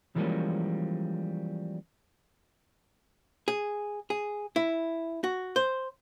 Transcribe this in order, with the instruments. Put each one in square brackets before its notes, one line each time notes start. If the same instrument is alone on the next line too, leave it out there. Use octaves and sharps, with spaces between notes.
[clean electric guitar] E3 F3 G3 G#3 A#3 C#4
[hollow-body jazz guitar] G#4
G#4
E4
F#4
C5